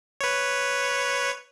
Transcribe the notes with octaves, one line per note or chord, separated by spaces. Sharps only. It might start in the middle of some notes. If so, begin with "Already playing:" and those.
B4 C#5